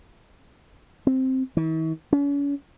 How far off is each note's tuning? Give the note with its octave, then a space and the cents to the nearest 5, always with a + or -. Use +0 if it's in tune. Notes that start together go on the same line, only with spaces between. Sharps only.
C4 +0
E3 -45
C#4 +40